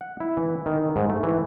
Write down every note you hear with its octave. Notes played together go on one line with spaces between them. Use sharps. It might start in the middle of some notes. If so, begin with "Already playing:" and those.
F#5
E4
E3
D#3
G#2
A3
E3